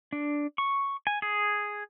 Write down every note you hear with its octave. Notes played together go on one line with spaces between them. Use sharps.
D4
C#6
G#5
G#4